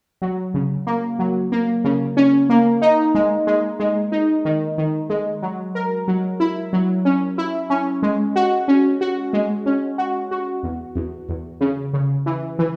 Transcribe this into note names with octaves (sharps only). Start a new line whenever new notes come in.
F#3
C#3
A#3
F#3
A#3
C#3
C#4
A#3
D#4
G#3
G#3
G#3
D#4
D#3
D#3
G#3
F#3
A#4
F#3
E4
F#3
C#4
E4
C#4
G#3
F#4
C#4
F#4
G#3
C#4
F#4
F#4
E2
E2
E2
C#3
C#3
E3
E3